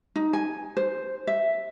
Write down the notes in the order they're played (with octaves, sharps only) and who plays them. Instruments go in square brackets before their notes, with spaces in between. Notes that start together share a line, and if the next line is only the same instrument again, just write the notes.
[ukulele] D#4
G#5
C5
E5